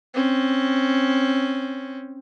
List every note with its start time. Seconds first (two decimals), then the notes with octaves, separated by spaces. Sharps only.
0.14 C4 C#4